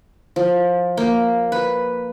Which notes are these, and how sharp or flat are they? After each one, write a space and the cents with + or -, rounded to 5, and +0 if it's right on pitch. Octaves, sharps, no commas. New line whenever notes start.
F3 +15
A#3 +0
B4 +0